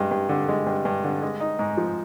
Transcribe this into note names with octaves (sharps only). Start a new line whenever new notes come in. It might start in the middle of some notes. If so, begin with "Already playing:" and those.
Already playing: G2 G#3
G2
D3
G#3
G2
G2
D3
G#3
D#4
G#2
F3